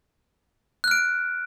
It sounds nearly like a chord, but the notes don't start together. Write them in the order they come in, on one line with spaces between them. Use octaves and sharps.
F#6 F6 D7